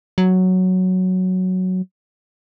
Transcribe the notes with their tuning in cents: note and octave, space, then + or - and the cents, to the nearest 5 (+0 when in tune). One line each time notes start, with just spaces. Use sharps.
F#3 +0